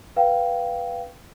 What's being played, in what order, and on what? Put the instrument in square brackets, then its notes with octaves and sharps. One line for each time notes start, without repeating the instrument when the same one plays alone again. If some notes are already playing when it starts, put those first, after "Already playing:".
[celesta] B4 F5 G5